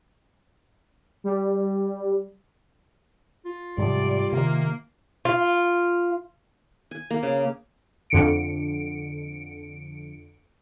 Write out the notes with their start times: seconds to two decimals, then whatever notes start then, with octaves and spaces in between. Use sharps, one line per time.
1.24 G3
3.45 F4
3.78 G#2 C3 F3 G3 D5
4.33 C3 D#3 A#3
5.25 F4
6.91 G#5
7.11 A#3
7.23 C#3
8.10 F2 D3 C#7 D7